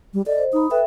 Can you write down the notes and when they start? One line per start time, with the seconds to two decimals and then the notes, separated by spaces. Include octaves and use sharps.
0.14 G3
0.26 A4 D5 D#5
0.38 C5
0.53 D#4 B5 D#6
0.71 A4 B4 E5 G5